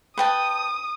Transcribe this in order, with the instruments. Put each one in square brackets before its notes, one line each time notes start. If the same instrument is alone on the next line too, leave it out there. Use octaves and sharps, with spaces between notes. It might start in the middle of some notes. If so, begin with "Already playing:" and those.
[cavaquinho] B4 G5 A5 [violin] D#6